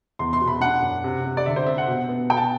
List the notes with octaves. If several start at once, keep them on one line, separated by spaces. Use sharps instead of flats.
E2 C6
C6
B2
B5
D4 F#5
F#2
C3
C3
D5
D3 E5
C5
C4 E5
F#5
B2
B3
B2 G5
A5